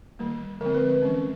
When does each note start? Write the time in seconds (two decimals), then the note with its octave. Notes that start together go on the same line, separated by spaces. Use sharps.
0.19 D#3 G3 A#3
0.61 D3 F3 G#3 C4 A#4
0.75 B4
0.89 B4
1.02 E3 G#3 C#4